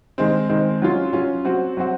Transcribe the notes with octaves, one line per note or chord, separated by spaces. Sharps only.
D#3 G#3 C4
D#3 G#3 C4
F#3 C#4 F4
F#3 C#4 F4
F#3 C4 F#4
F#3 C4 F#4